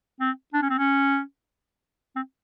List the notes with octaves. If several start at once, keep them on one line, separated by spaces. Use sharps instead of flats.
C4
D4
C#4
C4
C#4
C4